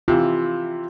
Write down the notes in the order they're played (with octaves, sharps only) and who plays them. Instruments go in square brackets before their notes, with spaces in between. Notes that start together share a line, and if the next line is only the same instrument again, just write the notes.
[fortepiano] C3 E3 [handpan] F4